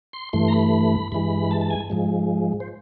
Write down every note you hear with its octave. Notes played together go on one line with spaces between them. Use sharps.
C6
G2 E3 A3 C6
A#5
B5
G2 E3 G#3 B5
A5
A5
G#5
G#2 F3 G#3
C5